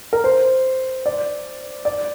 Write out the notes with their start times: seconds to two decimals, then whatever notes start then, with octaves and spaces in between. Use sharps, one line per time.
0.13 A#4
0.24 C5
1.06 D5
1.85 D5